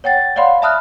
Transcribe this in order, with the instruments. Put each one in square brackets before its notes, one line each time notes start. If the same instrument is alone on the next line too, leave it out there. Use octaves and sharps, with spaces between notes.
[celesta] C#5 F#5 G5 A6
C#5 D5 F5 F#5 B5 C6
E5 A5 B5 D#6 F6 F#6